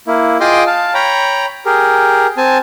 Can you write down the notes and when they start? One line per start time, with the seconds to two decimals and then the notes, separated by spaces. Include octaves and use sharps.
0.07 A#3 E4
0.40 F4 G#4 D#5 G5 C6 D6
0.67 F5 A5
0.95 C#5 G5 A#5 B5
1.66 G4 G#4 A#4
2.37 C4 G#5 A5